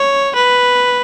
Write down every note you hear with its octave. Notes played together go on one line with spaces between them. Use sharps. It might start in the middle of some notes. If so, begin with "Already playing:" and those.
Already playing: C#5
B4